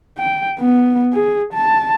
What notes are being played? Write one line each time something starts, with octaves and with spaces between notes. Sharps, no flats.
G5
B3
G#4
A5